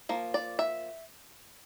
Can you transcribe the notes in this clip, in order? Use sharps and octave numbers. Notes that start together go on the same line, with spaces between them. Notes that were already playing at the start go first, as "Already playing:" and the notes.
F3 A#3
D5
E5